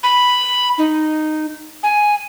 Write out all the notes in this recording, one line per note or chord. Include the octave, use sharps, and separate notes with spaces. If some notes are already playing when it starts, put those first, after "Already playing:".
B5
D#4
G#5